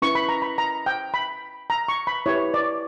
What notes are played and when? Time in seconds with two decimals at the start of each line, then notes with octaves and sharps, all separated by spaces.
0.02 C#4 E4 B4 C#6
0.15 B5
0.29 A#5
0.42 B5
0.58 A#5
0.86 G5
1.14 B5
1.70 A#5
1.88 C#6
2.07 B5
2.26 E4 G4 B4 C#5
2.54 D5